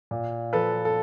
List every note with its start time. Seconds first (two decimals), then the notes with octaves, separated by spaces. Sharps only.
0.11 A#2
0.53 F3 A4 B4
0.85 A4